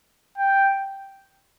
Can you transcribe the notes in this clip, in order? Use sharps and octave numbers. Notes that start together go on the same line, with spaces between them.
G5